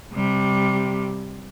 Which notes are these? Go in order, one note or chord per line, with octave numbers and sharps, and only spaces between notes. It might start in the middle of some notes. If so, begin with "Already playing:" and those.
C3 G3